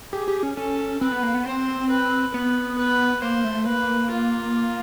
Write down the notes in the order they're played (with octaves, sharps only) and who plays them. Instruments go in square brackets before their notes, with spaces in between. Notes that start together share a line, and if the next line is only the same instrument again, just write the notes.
[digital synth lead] G4 [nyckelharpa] G#4
[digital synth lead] G4
C#4
[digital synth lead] C#4 [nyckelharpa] A4
[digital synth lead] C4 [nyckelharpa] B4
[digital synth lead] B3
A#3
B3
[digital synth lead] C4 [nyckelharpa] C5
[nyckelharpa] B4
[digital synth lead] B3 [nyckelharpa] B4
[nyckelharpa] B4
[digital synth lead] A#3 [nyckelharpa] C5
[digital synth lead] A3
[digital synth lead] A#3 [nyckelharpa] B4
[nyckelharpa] F4